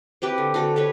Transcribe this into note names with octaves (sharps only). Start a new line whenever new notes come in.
C4 E4 G4 B4
D3
D3 F#4 A4
G4 A4 B4 C#5